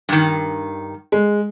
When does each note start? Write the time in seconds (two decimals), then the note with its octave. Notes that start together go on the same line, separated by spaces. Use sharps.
0.09 G2 D#3
1.12 G#3